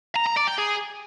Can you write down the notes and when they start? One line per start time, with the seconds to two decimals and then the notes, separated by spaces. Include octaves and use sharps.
0.16 A#5
0.27 A#5
0.37 D5
0.48 G5
0.58 G#4